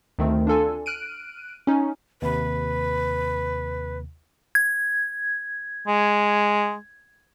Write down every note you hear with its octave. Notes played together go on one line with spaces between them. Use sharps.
D2 D#3 A3 C4
D4 F4 A4 G#5
F6 F#6 D7 D#7
C#4 D#4
D#2 C3 B4
G#6
G#3